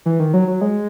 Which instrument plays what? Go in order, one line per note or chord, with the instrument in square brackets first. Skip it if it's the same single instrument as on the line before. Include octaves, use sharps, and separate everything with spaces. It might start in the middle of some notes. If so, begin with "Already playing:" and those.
[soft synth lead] E3
D#3
F#3
F#3
G#3